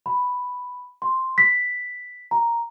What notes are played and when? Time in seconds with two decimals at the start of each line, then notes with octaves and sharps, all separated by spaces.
0.06 B5
1.02 C6
1.38 B6
2.31 A#5